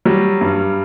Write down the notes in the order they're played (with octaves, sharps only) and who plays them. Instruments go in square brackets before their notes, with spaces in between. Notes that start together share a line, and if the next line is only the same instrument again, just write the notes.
[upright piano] F#3 G3
G2